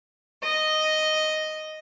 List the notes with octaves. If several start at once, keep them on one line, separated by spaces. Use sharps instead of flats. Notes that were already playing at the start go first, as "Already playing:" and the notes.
D#5